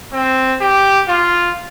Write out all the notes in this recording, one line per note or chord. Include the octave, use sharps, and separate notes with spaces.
C4
G4
F4